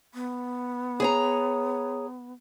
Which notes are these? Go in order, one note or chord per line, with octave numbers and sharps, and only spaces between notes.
B3
G#4 C#5 A#5